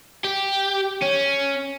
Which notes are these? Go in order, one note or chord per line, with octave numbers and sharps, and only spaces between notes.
G4
C#4